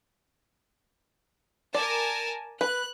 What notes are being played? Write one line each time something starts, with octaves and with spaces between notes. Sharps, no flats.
A#4 D5 G#5 A5
B4 F#6